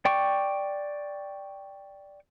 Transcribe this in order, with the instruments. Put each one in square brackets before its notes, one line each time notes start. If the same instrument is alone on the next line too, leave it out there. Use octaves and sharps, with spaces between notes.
[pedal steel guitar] D5 G5 C#6 D6